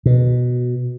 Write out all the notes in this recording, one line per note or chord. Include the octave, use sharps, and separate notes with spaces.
B2